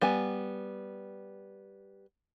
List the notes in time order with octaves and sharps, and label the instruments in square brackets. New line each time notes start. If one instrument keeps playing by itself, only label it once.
[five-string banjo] G3 B3 G#5